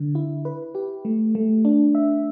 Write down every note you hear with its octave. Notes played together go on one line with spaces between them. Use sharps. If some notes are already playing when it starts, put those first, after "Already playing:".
Already playing: D3
E4
B4
G4
A3
A3
D4
E5